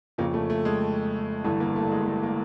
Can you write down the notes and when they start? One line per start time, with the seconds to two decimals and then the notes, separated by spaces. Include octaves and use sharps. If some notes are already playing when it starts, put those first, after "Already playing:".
0.18 F2 C#3 F3 A#3
0.34 A3
0.50 A3
0.65 G#3
1.44 G1 G2 E3 A3
1.60 A#3
1.76 A3
1.92 G#3
2.06 A3
2.23 A#3